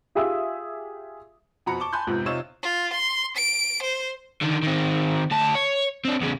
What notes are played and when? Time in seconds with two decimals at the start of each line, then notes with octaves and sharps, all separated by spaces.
0.15 F4 G4 G#4 E5 D#6 E6
1.66 F2 B2 F#4 A#5 B5 C#7
1.80 A5 C#6 D6 G7
1.93 G#5 A5 B5 C6 F#6 G6
2.07 F2 G#2 C3 F3 B3
2.26 C3 D#4 F4 C#5 E6 E7
2.63 F4
2.93 C6
3.37 D7
3.82 C5
4.41 D3 D#3
4.63 D#3 C4
5.31 D2 A5
5.55 C#5
6.05 C4 D4
6.21 E2 C#3